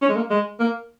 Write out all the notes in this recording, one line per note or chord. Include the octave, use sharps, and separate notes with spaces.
C#4
G#3
A#3
G#3
A#3